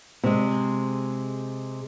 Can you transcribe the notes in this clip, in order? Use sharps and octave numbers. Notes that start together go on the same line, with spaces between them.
C3 G#3